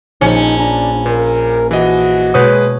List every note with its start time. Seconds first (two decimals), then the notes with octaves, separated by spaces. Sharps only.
0.21 A#1 C#4 D#4
0.59 D4 A#5
1.06 A#2 A#4
1.71 E3 F#4 D#5
2.34 B2 G#3 B4 C#5 D#6 G6